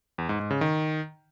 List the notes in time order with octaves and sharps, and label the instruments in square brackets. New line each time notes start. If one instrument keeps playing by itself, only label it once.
[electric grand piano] E2
G#2
G#2
C#3
D#3